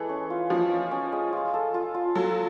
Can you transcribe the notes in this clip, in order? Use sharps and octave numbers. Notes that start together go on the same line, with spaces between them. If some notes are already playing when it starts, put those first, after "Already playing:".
Already playing: E3 G#3 A4
C#4
F4
F3 F4
C#4
C#4
G#3
F4
A4
F4
F4
F#3 A4